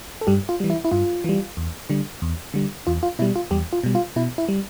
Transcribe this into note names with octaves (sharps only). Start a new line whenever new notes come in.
A4
G2 G3 G4
F4
E3 G3
E4
E4
G2 F4
E3 G3
E2
D3 G3
E2
D3 G3
E2 F4
F4
B2 G3 E4
F4
E2 G3 G4
F4
B2 G3
F4
B2 E4
E4
G3